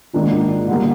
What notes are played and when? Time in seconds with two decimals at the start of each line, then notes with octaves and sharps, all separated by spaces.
0.13 G#2 D#3 A#3 D4 F4
0.68 D3 G3 A#3